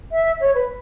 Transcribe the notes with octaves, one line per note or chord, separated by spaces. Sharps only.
E5
C#5
B4